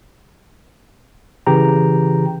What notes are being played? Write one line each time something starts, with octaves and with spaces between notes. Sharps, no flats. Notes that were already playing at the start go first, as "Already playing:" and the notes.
C#3 E3 G4 G5 A#5